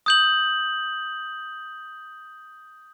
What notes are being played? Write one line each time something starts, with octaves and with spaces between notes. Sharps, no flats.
D#6 G6 F#7